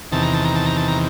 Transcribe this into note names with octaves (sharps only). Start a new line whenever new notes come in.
E2 C3 D#3 A5
A#5
A5
A#5
A5
A#5
A5
A#5